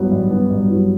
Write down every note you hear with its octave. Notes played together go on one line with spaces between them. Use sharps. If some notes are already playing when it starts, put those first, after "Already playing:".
Already playing: G2 F#3 B3
G2
B3
G2
F#3